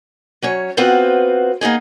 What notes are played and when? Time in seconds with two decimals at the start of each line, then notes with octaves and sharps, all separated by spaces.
0.42 F#3 C#4 C#5
0.77 B3 C4 F4 F#4 B4 C5
1.61 A#3 B3 D#4 G#4